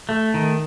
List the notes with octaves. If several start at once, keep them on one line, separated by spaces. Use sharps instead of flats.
A3
D#3